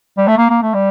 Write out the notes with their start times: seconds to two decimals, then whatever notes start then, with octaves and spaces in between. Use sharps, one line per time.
0.18 G3
0.28 A3
0.38 A#3
0.50 A#3
0.62 A3
0.74 G3